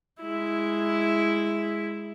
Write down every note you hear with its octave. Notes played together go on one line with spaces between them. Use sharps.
G#3 E4